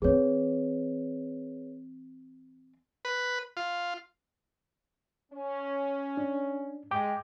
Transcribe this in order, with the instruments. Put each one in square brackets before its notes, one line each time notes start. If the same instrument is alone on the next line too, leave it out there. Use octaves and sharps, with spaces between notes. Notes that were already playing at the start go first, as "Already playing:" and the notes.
[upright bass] E3 C4 [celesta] G#4 B4 C#5
[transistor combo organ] B4
F4
[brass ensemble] C#4
[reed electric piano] D4
[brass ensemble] G#3 [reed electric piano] G5 D6